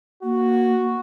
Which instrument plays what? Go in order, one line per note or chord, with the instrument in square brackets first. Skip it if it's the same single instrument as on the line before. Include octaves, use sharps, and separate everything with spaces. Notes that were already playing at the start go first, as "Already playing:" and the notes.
[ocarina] A#3 [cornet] F#4